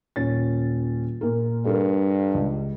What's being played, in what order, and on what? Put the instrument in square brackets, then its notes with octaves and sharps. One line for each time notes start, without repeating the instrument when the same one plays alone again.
[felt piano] D#1 C#4 A6
A#2 A#4
[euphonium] G2 [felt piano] A4 A#4
[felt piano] C#2